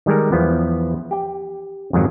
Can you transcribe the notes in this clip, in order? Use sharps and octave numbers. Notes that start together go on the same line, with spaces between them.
D#3 G3 G#3 A4 A#4
E2 F3 B3
G4 G5
F2 G#2 D#3 F#3